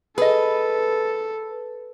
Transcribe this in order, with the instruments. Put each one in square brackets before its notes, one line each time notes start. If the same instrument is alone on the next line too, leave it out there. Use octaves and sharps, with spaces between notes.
[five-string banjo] G#4 D#5 [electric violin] A4 [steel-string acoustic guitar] B4